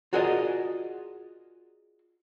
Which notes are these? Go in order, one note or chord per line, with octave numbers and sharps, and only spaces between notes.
F4 F#4 G#4 A#4 D5 D#5